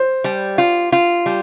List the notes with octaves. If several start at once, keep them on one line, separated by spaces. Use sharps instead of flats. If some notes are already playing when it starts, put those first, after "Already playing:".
Already playing: C5
G3
F4
F4
G3